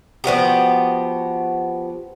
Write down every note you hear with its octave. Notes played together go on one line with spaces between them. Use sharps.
F3 B3 F#4 G4